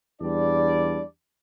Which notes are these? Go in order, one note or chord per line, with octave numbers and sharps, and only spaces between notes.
E2 G3 D4 D5